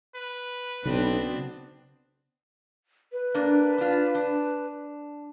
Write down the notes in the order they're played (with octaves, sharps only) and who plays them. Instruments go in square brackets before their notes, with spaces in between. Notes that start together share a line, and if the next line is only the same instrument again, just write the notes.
[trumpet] B4
[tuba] B1 [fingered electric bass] C#3 [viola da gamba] B3 C4 D4
[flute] B4
[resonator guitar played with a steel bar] A#3 D4
D4 F4
D4